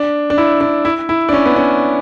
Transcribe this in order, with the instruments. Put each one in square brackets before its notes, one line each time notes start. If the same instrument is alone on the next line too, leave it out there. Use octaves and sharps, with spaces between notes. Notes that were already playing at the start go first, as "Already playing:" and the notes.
Already playing: [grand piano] D4
D4
E4
D4
E4
E4
D4
C#4
B3
C#4